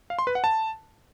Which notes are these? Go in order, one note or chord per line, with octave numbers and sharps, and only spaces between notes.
F5
C6
B4
F#5
A5